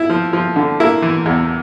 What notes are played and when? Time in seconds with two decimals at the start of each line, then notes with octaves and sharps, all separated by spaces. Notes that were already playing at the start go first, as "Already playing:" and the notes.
Already playing: E4
0.10 F3
0.33 F3
0.56 D3
0.80 A#3 E4
1.02 E3
1.26 E2